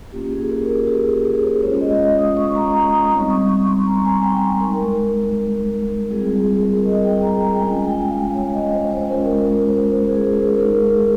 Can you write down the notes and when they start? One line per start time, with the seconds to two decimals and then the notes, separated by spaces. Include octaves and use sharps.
0.12 A#3 C#4 F4 G4
0.31 G#4
0.50 A#4
0.69 G#4
0.87 G4
1.06 G#4
1.25 G#4
1.43 C5
1.62 G#3 C#4 F4 C#5
1.81 D#5
1.95 D#5
1.99 F5
2.19 D#6
2.37 C#6
2.56 A#5
2.74 A#5
2.93 D#6
3.12 G3 C4 D#4 C#6
3.30 C#6
3.49 C#6
3.67 C6
3.86 A#5
4.05 G#5
4.24 G5
4.61 G#3 D#4 A#4
6.10 G3 C4 F4 G#4
6.36 G#4
6.61 A#4
6.85 D#5
7.04 G5
7.22 A#5
7.42 G5
7.53 G5
7.60 G#3 C#4 F4 G#5
7.74 G#5
7.85 G5
8.10 F5
8.34 C#5
8.54 D#5
8.73 C5
8.91 C5
9.09 G#3 C#4 F4 A#4
9.47 A#4
9.66 C5
10.09 G#4
10.34 A#4
10.59 G#3 D#4 A#4
10.84 G#4